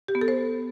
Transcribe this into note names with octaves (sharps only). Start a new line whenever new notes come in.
G4
B3
A4
C5